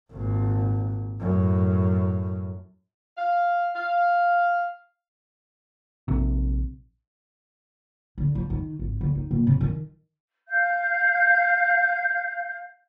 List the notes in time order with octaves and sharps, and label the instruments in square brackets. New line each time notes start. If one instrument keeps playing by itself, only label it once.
[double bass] G#1 A#2
F#2 A2
[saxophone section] F5
F5
[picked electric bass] A#1 C3
[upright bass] D3
F3
D#3
G#1
D3
D#4
A#2
C3
D#3
[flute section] F5 G6